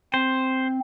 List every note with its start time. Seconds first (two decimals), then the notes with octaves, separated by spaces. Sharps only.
0.14 C4 C5